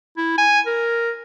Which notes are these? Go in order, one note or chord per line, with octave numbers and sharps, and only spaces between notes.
E4
G#5
A#4